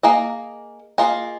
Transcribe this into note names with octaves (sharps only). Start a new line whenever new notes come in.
A#3 G#4 D#5
A#3 F4 G#4 D#5